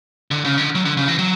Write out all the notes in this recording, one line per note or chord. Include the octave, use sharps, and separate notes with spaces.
D3
C#3
D3
F#3
D3
C#3
E3
F#3